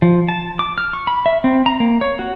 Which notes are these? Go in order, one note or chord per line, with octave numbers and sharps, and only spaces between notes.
F3
A5
D6
F6
C#6
B5
E5
C4
A#5
A#3
C#5
F#4